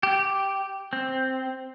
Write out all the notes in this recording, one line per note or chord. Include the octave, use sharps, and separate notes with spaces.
G4
C4